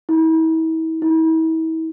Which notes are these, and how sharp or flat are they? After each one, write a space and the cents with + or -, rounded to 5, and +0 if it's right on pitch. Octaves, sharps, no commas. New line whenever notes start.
E4 -40
E4 -40